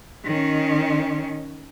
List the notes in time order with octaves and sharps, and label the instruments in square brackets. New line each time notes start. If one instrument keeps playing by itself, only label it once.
[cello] D#3 C#4